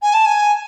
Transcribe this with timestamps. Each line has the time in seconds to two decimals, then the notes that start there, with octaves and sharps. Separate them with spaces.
0.02 G#5
0.13 A5
0.25 G#5